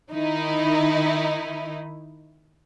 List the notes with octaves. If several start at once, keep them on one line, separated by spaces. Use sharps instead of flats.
D#3 D#4 E4